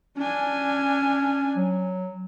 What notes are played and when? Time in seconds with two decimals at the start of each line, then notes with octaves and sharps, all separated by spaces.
0.17 C#4 D4 G#5
1.56 F#3